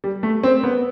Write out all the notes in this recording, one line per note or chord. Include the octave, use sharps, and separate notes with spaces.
G3
A3
C4
B3